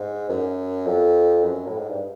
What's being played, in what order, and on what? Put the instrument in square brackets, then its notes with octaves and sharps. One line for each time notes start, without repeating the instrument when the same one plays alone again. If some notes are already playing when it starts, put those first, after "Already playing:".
Already playing: [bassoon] G#2
F#2
F2
F#2
A2
G#2
G2